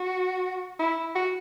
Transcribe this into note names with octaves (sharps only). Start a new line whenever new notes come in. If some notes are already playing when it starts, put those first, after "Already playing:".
Already playing: F#4
E4
F#4